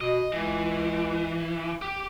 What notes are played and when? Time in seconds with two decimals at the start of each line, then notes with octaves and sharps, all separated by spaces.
0.01 B2 D#5
0.32 C#2 E3
1.82 G4